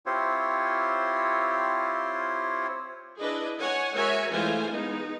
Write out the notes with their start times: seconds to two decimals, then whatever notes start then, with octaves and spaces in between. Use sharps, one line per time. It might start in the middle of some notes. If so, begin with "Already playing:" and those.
0.06 C4 E4 F4 G4 C5 C#5
3.20 D4 E4 G#4 B4 D#5
3.58 C#5 F#5 G#5
3.94 G#3 F#4 A#4 C#5 E5 G#5
4.30 E3 G#3 A3 F4 C5 G#5
4.69 G#3 B3 D#4